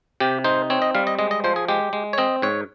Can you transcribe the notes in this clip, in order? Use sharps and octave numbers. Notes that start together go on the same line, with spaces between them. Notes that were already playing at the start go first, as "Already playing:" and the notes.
C3 G4
D#4 C5
C4 C#5
D#5
G3 F5
D#5
G#3 D#5
D#5
F3 C5
G#4
G#3 G4
G#3
C#5
C4 D#5
G#2 C#5